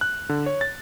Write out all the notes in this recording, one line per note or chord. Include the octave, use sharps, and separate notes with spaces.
F#6
D3
C#5
A6